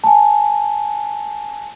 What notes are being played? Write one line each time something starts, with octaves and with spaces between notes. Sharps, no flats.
G#5 A5